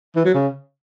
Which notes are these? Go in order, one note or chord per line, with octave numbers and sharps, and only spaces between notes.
E3
F#3
C#3